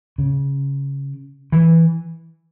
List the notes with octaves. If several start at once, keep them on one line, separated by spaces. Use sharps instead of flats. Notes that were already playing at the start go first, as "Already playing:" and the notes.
C#3
E3